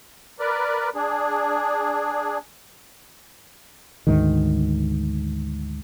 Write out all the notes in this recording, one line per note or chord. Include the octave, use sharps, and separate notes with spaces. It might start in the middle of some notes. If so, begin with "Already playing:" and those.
A#4 B4 D5
D4 G#4
D2 G#2 D#3